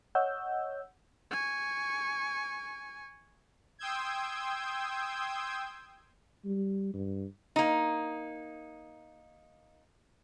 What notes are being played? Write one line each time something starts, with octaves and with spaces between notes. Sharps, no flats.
C#5 D#5 F#5 E6 G6
G#5 C#6
G5 C6 D#6 E6 G6 G#6
G3
G2
A#3 D#4